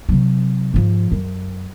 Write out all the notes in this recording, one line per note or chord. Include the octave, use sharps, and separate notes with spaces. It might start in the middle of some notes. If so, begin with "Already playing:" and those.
C3 F#3
G#2 F3
F#2